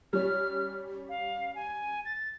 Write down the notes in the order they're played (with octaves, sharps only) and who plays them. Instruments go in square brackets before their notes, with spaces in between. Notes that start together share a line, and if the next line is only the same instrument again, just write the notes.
[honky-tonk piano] G3 C#4 [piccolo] F6
[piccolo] F5
G#5
A6